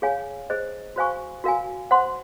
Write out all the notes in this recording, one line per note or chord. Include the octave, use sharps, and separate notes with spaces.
G#4 C#5 F5 G#5
G#4 C5 D#5
F#4 C5 F5 G#5 C#6
F#4 A#4 F5 G#5
C5 F#5 C6